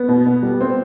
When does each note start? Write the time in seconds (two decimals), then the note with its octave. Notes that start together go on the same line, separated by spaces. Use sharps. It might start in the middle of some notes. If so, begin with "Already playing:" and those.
Already playing: B3
0.09 B2
0.26 B2
0.43 G3
0.61 C4